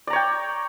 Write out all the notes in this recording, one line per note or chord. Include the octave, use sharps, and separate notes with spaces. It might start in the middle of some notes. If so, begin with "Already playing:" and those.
C#5 D5 G5 A#5